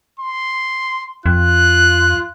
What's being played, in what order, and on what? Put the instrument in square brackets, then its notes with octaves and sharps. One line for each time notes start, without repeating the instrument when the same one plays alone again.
[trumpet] C6
[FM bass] F2 [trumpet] F4 [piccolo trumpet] F#6